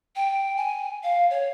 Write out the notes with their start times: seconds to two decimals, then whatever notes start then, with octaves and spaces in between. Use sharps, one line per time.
0.16 G5
0.57 G#5
1.04 F5
1.30 C#5